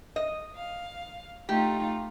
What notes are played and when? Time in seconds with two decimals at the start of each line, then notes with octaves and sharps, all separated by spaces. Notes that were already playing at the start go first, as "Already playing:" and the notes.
0.16 D#5
0.56 F5
1.49 A3 D#4 F4 G4